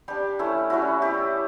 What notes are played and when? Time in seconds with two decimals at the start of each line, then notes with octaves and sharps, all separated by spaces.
0.08 G3 D4 G4
0.39 A3 C#4 E4
0.70 G3 C#4 E4 F#4
1.02 G3 C#4 E4 G4